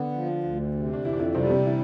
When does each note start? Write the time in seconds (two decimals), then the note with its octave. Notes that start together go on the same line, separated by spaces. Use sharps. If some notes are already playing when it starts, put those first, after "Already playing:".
Already playing: D3 B3 D4
0.12 F3
0.44 D2
0.74 C3
0.93 D4
1.05 F2 E3 E4
1.13 D4
1.20 E3 E4
1.35 C3 G3 C4
1.50 C3 C4
1.65 E3 E4